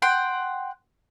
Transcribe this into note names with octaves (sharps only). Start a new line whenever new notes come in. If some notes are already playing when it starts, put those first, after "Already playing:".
F#5 G5 C6